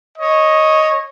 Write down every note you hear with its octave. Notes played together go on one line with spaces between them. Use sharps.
C#5 D#5